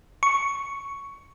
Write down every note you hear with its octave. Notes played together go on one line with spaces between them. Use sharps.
C#6